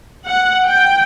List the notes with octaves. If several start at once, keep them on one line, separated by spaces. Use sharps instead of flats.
F#5
G5